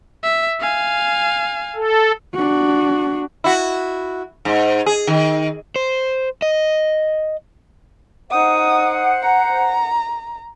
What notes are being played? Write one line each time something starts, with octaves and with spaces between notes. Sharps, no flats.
E5
F5 G#5
A4
D4 F#4
E4 F#4
G#2
G#4
D#3
C5
D#5
D#4 C5 F#5 D#6
A#5